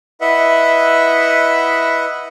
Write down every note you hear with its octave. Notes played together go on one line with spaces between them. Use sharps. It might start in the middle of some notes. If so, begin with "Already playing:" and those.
E4 B4 D#5 E5 F#5